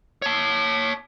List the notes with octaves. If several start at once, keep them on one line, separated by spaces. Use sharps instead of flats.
C#5 A5